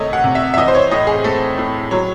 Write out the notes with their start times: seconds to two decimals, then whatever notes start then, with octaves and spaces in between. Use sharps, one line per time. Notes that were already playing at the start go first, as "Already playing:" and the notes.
Already playing: C3 D#3 A3 C#5 D#5
0.13 F#5
0.24 C3
0.35 E5
0.54 E5
0.57 E3 D#5
0.68 C5
0.75 C#5
0.91 A2 D#5
1.07 G#4
1.24 A3 A4
1.58 A2
1.91 F#3 C#5